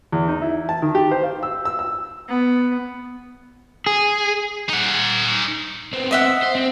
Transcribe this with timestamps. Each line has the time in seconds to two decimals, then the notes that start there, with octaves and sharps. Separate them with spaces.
0.12 E2
0.28 D#4
0.42 E4
0.69 A5
0.82 D#3
0.95 G4
1.11 C5
1.23 F5
1.43 E6
1.65 E6
1.79 E6
2.28 B3
3.86 G#4
4.69 D#4 F#5
5.93 B3 C4
6.11 D#5 E5 F#5
6.43 C5
6.55 C4